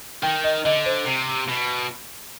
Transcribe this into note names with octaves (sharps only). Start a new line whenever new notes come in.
D#3 G5
D#5
D3 D#5
C5
C3
B2